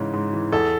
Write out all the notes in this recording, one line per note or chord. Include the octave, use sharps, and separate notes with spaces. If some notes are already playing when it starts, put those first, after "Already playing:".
Already playing: G#2 C#3 E3
G#2
E3
E2 A4